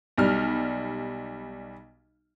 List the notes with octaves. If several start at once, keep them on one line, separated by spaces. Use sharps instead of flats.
B1 G3 F6